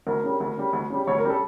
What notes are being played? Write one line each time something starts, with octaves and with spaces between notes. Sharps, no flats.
D2 A#4
C#3 G3
D2
C#3 G3
D2
C#3 G3
D2 C#5
A#4
C#3 G3
A4